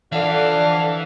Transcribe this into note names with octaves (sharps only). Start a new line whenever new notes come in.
D3 E3 F3 F#4 D5 F5